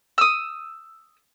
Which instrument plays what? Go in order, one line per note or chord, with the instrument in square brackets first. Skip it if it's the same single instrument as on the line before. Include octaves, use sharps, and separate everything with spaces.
[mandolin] D#6 E6